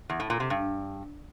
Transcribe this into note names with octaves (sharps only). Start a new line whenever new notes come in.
E2
A2
A#2
C3
G2